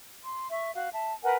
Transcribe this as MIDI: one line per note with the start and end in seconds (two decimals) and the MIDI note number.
0.23 0.46 84
0.50 0.70 76
0.50 0.70 85
0.75 0.88 66
0.75 0.88 77
0.93 1.11 76
0.93 1.11 81
1.23 1.35 70
1.23 1.35 71
1.23 1.35 78
1.23 1.35 80